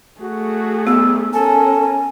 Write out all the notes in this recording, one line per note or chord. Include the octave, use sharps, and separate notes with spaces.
A3 F#4 G#4
C3 D#3 G3 B3 E6
C#4 A4 A#4 G#5